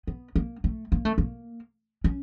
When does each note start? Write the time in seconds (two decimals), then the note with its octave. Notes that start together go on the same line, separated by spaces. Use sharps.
0.07 B3
0.36 A#3
0.64 A3
0.92 A#3
1.05 A3
1.18 A#3
2.04 C#4